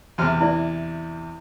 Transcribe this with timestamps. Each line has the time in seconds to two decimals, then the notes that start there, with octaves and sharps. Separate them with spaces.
0.18 E2 C3 F6
0.41 E4 D5